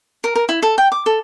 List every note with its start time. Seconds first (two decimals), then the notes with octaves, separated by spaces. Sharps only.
0.24 A#4
0.36 A#4
0.49 E4
0.62 A4
0.78 G5
0.92 D6
1.06 A4